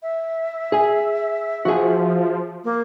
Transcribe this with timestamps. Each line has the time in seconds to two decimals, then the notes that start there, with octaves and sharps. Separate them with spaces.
0.03 E5
0.72 G#4 G#5
1.65 F3 F#4 G#4
2.64 A#3